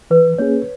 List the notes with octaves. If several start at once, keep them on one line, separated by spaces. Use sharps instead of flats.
E3 B4
A#3 C#4 G#4 C#5